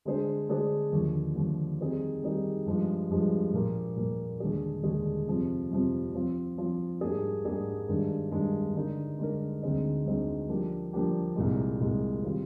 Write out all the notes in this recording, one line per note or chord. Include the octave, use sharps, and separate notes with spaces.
D3 G#3 D4 G#4 C5
D3 G#3 D4 G#4 C5
D#2 D3 F3
D#2 D3 F3
D#3 G3 C4 D#4 G#4
D#3 G3 C4 D#4 G#4
G2 F3 G#3
G2 F3 G#3
A#2 F3 A#3
A#2 F3 A#3
D#2 D3 G#3 D4 G#4
D#2 D3 G#3 D4 G#4
F2 C3 F3
F2 C3 F3
F3 C4 F4
F3 C4 F4
G#2 G3 A#3 D4 G#4
G#2 G3 A#3 D4 G#4
G2 D#3 G#3 D4
G2 D#3 G#3 D4
D3 G#3 D#4 A#4
D3 G#3 D#4 A#4
D2 D3 G#3 C4 D#4
D2 D3 G#3 C4 D#4
F3 A#3 D4 G4
F3 A#3 D4 G4
C2 A#2 G#3
C2 A#2 G#3
D#3 G3 C4 F4